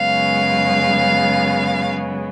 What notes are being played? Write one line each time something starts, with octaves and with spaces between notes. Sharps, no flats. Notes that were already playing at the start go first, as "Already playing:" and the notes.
Already playing: F#2 C#3 G#3 B3 F5